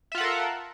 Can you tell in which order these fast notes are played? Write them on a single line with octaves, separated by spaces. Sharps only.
E5 F4 F#5 A4 A#4